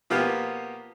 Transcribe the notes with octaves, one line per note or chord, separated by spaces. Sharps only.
B2 F3 A#3 B3 F4 G4